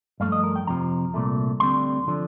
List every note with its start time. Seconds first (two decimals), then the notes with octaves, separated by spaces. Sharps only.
0.20 G2 F3 A3 F5
0.32 D#5
0.44 A#4
0.56 G5
0.67 F2 C3 F3 A#5
1.14 C2 A#2 A3
1.60 D2 D3 G3 C4 C6
2.07 D3 F3